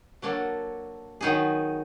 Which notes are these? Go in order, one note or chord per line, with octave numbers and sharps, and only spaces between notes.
F#3 A#3 D4 F#4 A4
D#3 F#3 B3 D#4 G#4